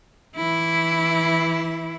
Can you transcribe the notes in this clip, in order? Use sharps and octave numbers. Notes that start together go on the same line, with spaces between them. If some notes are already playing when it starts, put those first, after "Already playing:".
E3 E4